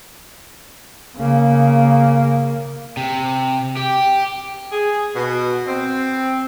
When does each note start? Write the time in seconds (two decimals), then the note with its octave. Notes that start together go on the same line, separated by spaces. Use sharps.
1.16 C#3 A#3
2.97 C3
3.77 G4
4.72 G#4
5.15 B2
5.67 C4